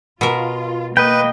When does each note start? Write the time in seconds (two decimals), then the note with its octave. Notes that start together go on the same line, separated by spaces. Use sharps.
0.21 B2 F4 A#4
0.97 A#3 B4 D#5 G5